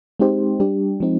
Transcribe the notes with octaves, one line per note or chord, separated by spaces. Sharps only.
G#3 C4 D#4 G4 C5
G3 D4 G4
F3 G#3 C4 D#4